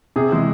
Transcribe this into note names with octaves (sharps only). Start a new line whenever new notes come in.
C3 G#4
E3 G#3